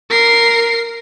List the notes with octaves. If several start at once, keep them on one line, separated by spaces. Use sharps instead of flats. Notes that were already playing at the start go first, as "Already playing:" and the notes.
A#4 C7